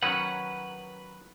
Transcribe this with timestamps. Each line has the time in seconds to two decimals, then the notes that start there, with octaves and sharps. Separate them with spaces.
0.03 D#3 F#3 C#4 B4 F#5